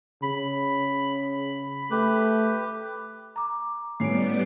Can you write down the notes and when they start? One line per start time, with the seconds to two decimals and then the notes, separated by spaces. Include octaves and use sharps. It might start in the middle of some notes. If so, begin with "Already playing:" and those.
0.23 C#3 B5
1.91 A3 G4 B4
3.36 A#5 D6
4.00 A2 G3 B3 C#4 C#5 D5 C7 D7